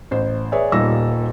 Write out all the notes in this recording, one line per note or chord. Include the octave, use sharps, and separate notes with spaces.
A1 C5
G#4 B4 C#5 D5 E5
D#1 A#2 G3 D#4 E6 A#6